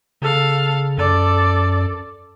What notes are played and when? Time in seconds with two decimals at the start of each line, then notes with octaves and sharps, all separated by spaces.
0.22 C#3 A4 F5
0.98 F#2 A4 D5